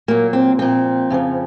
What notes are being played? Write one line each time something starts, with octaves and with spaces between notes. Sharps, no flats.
A#2 F#3 A#3
C4
A#2 F3 C4
F2 C#3 F3